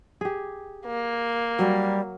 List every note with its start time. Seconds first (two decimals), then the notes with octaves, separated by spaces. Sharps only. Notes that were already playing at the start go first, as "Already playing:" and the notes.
0.21 G4 G#4
0.86 A#3
1.59 F#3 G3